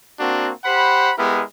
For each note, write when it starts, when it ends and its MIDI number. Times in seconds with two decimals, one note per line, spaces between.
0.20 0.52 58
0.20 0.52 60
0.20 0.52 62
0.20 0.52 66
0.65 1.12 67
0.65 1.12 72
0.65 1.12 78
0.65 1.12 83
1.18 1.43 56
1.18 1.43 59
1.18 1.43 64
1.18 1.43 67
1.18 1.43 70